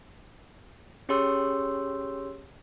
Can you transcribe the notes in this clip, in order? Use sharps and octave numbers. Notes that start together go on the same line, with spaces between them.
C#4 G4 G#4 C#5 C6 E6